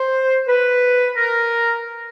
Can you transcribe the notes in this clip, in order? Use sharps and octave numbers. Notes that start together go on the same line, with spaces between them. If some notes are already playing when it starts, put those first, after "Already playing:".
Already playing: C5
B4
A#4